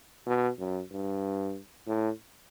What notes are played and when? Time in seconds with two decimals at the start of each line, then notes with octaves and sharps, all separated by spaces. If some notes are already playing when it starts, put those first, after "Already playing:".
0.26 B2
0.59 F#2
0.91 G2
1.87 A2